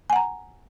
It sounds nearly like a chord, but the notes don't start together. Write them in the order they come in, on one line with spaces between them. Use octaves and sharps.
G#5 F#5 A#5